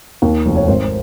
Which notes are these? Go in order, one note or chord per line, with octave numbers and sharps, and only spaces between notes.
D#2
F1
C#5
G#1 C5